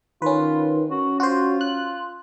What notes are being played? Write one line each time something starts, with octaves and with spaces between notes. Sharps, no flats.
D#3 C#4 F4 B4
C#4 F#4
F4 F#4 C5
F#6